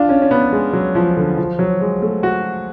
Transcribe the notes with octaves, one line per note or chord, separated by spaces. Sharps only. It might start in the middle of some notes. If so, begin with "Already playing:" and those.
Already playing: D4 F4
C#4
C#4
B3
G#3
F#3
F3
D3
F3
F#3
G#3
A3
F#4